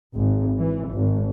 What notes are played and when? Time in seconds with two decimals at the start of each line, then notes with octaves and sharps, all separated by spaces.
0.14 G#1
0.58 E3
0.91 G#1